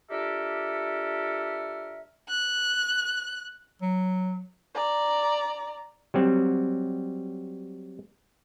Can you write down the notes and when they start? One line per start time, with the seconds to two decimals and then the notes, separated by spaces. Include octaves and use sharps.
0.10 D4 F4 G4 A4 A#4 E5
2.30 F#6
3.82 F#3
4.75 D5 A#5
6.14 F#3 G3 C4